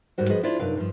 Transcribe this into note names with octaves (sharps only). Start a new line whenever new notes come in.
D#2 G#2 G3 F#4 C5
F3 F#4 G#4 B4 D#5
D4 E4 F4 C5 D5
F#2 C3 D4 D#4 B4 F5
G2 F3